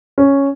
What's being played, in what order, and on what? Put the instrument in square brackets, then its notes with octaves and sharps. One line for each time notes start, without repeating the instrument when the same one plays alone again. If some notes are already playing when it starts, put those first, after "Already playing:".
[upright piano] C#4